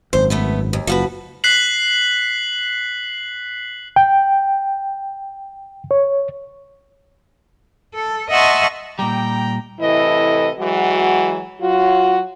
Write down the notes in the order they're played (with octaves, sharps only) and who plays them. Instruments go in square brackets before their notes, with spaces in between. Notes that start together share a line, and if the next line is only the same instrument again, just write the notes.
[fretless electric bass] G#1 F#2 [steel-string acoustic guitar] C5
[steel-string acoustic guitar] A3 B3 B4
D#2
[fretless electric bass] F#1 [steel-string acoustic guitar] F3 F#4 B4
[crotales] F#6 B6 C7 F#7
[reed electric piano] G5
C#5
[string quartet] A4
D#5 E5 F#5 A5 C6 C#6
[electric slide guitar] A#2 G3 [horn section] G5 A#5
[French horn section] A2 C3 E3 E4 A4 D#5
E3 F#3 G#3 F#4
F#3 F4 F#4